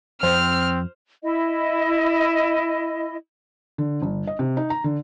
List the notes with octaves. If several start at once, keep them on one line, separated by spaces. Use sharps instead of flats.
F2 C4 C5 F6
E4 D#5
D3
G1
D#5
C3
D#4
A#5
D3